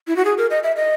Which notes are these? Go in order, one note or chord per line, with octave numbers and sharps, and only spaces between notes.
E4
F#4
G#4
A#4
D#5
E5
D#5